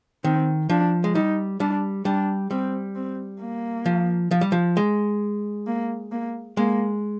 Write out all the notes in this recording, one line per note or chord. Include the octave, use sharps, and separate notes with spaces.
D#3 C4
F3 D4
G#3
G3 D#4
G3 D4
G3 D4
G3 C4
C4
A#3
F3
F3
G3
F3
G#3
A#3
A#3
G#3 A#3